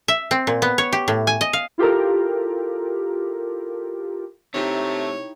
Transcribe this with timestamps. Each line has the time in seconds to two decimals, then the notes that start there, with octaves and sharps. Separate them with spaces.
0.08 E5
0.31 C4
0.47 A#2
0.62 B3
0.78 C#5
0.92 G4
1.08 A2
1.27 G#5
1.41 D#5
1.53 F5
1.78 E4 F4 G4 A4 A#4
4.54 C3 A3 D#4 E4 G4 C#5